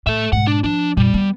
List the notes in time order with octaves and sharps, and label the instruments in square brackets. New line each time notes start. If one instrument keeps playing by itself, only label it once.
[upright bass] A2 [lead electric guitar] A4 E5
[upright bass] G#2 B2 [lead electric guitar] F#5
[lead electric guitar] D4
[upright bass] F3 [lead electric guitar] D4
[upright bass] F2 A#2 [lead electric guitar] G3
[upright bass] B3